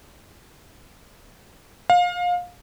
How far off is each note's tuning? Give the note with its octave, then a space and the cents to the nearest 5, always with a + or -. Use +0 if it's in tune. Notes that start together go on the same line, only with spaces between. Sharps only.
F5 +25